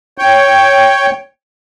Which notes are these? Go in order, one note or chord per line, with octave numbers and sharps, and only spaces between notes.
C#5 G5